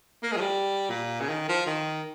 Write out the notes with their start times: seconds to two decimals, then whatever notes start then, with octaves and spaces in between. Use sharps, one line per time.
0.23 A#3
0.32 G#3
0.37 F3
0.41 G3
0.90 A#2
1.20 C#3
1.29 D#3
1.48 F3
1.67 D#3